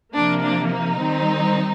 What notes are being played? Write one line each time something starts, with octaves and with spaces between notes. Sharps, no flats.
C3 F3 A#3 D4
D4
D#4
D#3 G3 C4